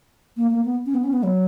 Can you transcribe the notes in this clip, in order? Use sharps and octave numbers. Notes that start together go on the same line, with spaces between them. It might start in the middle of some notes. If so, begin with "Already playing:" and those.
A#3
A#3
B3
C#4
B3
C#4
B3
F#3